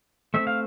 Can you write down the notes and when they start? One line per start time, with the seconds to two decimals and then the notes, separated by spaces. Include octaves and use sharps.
0.34 A3 C4 E5
0.47 F5